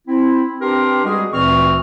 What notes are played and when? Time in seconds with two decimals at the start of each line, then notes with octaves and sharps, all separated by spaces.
0.08 C4 E4
0.60 C4 D4 G4 A#4 B4 C6
1.04 G3 G#3 F#4 G#4
1.32 D2 A#2 E3 C4 C#6 F6